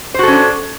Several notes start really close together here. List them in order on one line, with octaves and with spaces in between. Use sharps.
C5 F#4 A4 C#4 D4